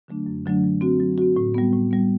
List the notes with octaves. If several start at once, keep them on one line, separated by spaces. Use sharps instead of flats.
D3 F#3 A3 D4
F#2
D3 F#3 A3 D4
F#3
C4 F#4
F#3
C4 F#4
A2
G3 B3
A2
G3 B3